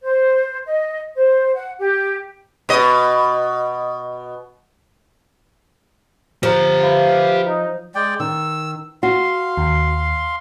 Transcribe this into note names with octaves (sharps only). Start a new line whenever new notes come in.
C5
D#5
C5
F#5
G4
B2 D#5
F3 G4 A#5
B4 E5 F5
D#4
G#3 D5 G5
D#3 E6
F#4 F5 C6
D#2